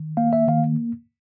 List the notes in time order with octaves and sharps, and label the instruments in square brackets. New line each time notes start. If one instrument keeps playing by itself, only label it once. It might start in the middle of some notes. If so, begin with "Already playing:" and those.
Already playing: [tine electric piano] D#3
A#3 F5
E5
D#3 F5